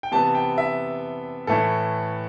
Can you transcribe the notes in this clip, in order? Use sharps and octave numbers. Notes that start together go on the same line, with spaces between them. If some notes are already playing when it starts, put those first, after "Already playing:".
G5
C3 E3 B3 A5
G5
E5
A2 E3 A3 E4 A4